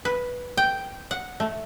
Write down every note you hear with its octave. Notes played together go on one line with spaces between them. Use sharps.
B4
G5
F#5
A3